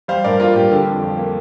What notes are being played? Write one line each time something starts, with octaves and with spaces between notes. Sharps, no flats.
G3 C5 F5
G2 A#4 D5
A#3 F4 A#4
G2 G4
D3 G4
F2
F3
A#3